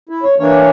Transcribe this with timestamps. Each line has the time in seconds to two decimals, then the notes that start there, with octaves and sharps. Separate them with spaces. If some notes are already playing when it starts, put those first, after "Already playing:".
0.09 E4
0.23 C#5
0.38 E3 A#3 D4 C#5